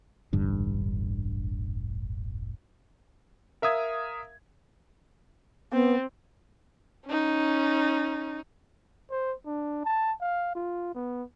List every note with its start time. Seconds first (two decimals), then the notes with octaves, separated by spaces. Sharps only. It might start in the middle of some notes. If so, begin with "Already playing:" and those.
0.33 E1 A1 G2 D3
3.62 A#4 E5 F5 D#6 G#6
5.73 B3 C4
7.06 C#4 D#4
9.11 C5
9.46 D4
9.85 A5
10.21 F5
10.55 F4
10.95 B3